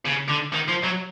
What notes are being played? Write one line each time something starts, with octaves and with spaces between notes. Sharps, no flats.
C#3
D3
D#3
F3
F#3